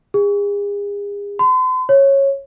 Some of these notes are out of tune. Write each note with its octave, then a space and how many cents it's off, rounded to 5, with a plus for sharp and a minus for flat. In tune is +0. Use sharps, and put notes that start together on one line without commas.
G#4 -40
C6 -45
C#5 -15